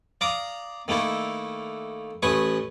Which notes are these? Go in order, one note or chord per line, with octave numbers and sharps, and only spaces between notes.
D5 F5 A#5 D6 D#6
D#3 A3 A#3 E4 A4
A1 A3 B4 G#5 C#6 D#6